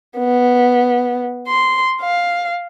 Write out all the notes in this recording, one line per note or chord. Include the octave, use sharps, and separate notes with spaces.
B3
C6
F5